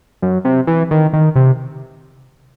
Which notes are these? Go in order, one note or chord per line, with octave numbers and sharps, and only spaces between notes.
F#2
C3
E3
D#3
D#3
C3